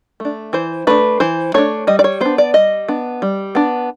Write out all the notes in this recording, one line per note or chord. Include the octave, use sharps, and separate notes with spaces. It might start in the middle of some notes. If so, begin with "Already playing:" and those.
A3 D4
E3 C5
A3 D4 B4
E3 C5
A3 D4 C#5
G3 D#5
D5
C#5
B3 D4 C5
D5
G3 D#5
B3 D4
G3
B3 D4